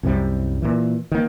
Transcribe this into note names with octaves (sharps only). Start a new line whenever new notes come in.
C2 F#2 C3 G3
A#2 E3
D#3 A#3